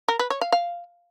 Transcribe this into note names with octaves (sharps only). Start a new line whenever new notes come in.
A#4
B4
C#5
F5
F5